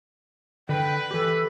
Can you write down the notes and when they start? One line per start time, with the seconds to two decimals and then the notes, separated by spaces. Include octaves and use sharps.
0.69 D3 B4 G5
1.11 E3 G4 A4